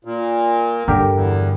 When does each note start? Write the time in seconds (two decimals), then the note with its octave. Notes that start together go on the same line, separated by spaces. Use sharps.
0.05 A#2
0.88 G2 D3 G4 A#4
1.13 E2